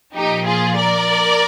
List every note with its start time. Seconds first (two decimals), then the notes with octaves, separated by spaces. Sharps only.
0.14 A#2 F3 D#4 G4
0.46 F4 G#4
0.77 A#4 D5